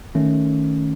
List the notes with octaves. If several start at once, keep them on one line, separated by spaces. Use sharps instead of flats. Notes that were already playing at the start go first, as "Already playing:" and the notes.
D#3 A3 C#4